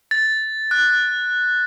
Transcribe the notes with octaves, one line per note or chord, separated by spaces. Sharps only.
A6
F#6